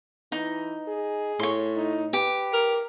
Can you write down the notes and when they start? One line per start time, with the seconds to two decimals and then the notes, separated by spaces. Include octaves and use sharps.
0.32 E3 D#4
0.88 G#4
1.40 A2 C#5 C6
1.76 D#4
2.13 G4 B4
2.53 A#4